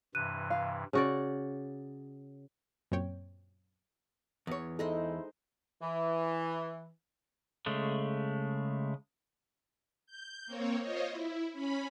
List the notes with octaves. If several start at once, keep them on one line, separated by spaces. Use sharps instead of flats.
G2 C3 E3 F#6 D#7
F5
C#3 F#4 D5
F#2 A#2 C4 C#5 G5
E2 E3 C#5
G#3 D#4 E4 A4 C5
E3
C#3 G#3 A3
G6
A#3 C4 C#5
F4 C5 C#5 D#5
E4
C#4 B5